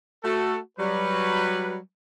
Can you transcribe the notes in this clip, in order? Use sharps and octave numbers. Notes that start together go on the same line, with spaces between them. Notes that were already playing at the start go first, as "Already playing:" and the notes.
A3 F#4 A4
F#3 G3 B4